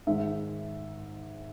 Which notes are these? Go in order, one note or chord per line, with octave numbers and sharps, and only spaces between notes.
G#2 D#3 G#3 E5